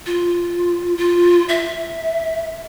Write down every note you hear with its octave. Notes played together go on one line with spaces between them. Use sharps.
F4
F4
E5